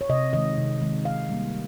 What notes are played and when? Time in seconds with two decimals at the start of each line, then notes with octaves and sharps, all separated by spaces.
0.01 C#5
0.09 C3 D#5
0.33 D#3 G#3 D#5
0.57 C3
0.82 D#3 G#3
1.05 D#3 F5
1.29 G3 A#3